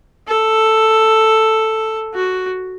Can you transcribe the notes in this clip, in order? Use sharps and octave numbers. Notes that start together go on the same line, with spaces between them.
A4
F#4